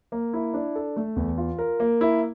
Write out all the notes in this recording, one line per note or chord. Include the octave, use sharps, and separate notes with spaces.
A#3
E4
D4
A4
A3
E2
F4
A#4
A#3
E4